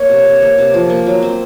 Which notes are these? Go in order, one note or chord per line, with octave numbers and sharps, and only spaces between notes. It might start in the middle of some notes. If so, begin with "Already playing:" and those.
Already playing: A#3 C#5
C3
C3
A#3
C3
F3
A#3
F#3
C4